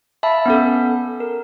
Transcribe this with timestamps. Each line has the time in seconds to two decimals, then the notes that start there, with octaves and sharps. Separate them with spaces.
0.23 E5 F5 A5 B5
0.46 B3 C#4 A4
1.20 A#4